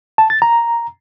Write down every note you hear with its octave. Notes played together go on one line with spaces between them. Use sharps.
A5
A6
A#5